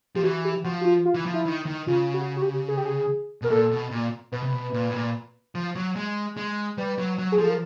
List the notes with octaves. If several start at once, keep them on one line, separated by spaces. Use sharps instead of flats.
F3 G4
E3 F#4
G4
F3 F#4
F#4
F4
F4
E3 E4
F3
E4
D#3
D#3
C#3 F4
F#4
F#4
G4
G#4
G4
G#4
B2 A#4
A#2 A4
B2
A#2
B2 B4
C3
B2
A#2
A2
A#2
F3
F#3
G#3
G#3
G3 B4
F#3
F#3
G#4
F3 A4
A#4